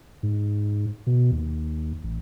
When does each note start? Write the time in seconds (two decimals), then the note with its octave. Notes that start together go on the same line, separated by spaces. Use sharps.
0.23 G#2
1.07 B2
1.31 D#2
2.04 A1